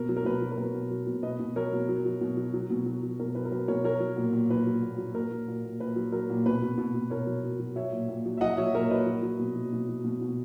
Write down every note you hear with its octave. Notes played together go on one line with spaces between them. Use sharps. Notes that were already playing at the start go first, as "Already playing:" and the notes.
Already playing: B2 A#4
F#3
A#4
B2 B4
F#3
A#4
B2 B4
B2
F#3
B2
B2 B4 D#5
B2
F#3 A#4 C#5
B2
F#3
F#3
B2
F#3
F#3
B2
F#3
F#3
B2 A#4
F#3 B4
A#4
F#3 B4
B2 A#4 C#5
F#3 A#4 C#5
F#3
A#2
A#2
F#3 B4
F#3
A#2
F#3
A#2 A#4
F#3
A#2
A#2
A#2 B4
F#3
F#3 A#4
A#2
B2 B4
B2
B2
B2
B2 A#4 C#5
F#3
F#3
F#3
F#3 C#5 E5
A#2
A#2
F#3
E5
F#3 D#5 F#5
F#3 C#5 E5
A#2 A#4 C#5
F#3 B4 D#5
F#3
F#3
B2
F#3
B2
F#3
B2
B2